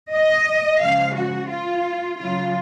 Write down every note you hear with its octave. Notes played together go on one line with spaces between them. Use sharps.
D#5
C#3 F3 G#3 F5
F#4
F4
C#3 F#3 F4